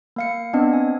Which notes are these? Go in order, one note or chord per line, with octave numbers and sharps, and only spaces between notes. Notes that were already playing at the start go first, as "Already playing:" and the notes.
A#3 F5 C#7
B3 C4 D4 D#5
G#5